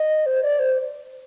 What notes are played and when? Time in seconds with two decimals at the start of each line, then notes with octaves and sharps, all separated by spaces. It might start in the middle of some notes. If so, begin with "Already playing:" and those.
Already playing: D#5
0.26 C5
0.43 D5
0.59 C5